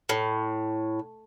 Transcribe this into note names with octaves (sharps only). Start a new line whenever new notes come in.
A2